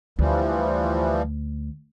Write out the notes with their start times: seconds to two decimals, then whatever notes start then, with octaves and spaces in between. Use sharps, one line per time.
0.19 D2 E3 F3 G3